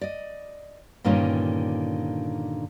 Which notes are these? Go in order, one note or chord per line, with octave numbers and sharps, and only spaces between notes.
D5 D#5
G2 A#2 D3 D#3 C#4 F4